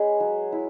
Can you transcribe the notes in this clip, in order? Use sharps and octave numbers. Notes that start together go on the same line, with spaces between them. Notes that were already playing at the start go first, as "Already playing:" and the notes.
Already playing: G#3 C#4 G#4 B4
F#3
E4